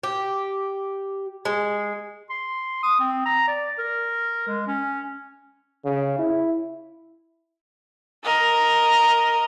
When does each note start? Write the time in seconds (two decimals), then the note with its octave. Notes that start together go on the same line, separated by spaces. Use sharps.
0.03 G4
1.45 G#3
2.30 C6
2.83 D#6
3.00 C4
3.26 A#5
3.48 D5
3.78 A#4
4.47 G#3
4.67 C#4
5.85 C#3
6.19 E4
8.24 A#4 D#5